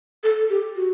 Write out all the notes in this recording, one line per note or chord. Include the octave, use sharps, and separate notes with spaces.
A4
G4
F#4